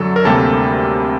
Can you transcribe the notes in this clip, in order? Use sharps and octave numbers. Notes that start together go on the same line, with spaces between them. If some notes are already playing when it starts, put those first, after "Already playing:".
Already playing: F#2 D3 F#3 A4
A#4
D2 C3 G3 A#3 A4